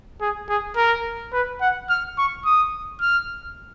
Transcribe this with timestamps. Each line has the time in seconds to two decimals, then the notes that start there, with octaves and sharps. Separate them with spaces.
0.21 G#4
0.49 G#4
0.77 A#4
1.33 B4
1.61 F#5
1.89 F6
2.18 C#6
2.45 D#6
3.01 F6